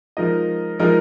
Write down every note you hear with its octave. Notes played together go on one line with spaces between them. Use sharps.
F3 G#3 D#4 A#4 D#5
F3 G#3 D#4 A#4 D#5